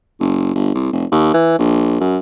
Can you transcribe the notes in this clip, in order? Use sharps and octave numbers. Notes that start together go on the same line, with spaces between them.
F#1
G1
C2
F1
D#2
E3
A#1
F#2